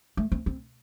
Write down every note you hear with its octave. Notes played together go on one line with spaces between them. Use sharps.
A3
C4
C4